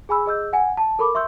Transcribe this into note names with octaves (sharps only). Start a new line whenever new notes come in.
G#4 G#5 B5 E6
G#4 D#5 E6 G6
F#5 G#5
A5
A4 A#4 B5 C#6 D6
E5 C6 C#6 E6 G6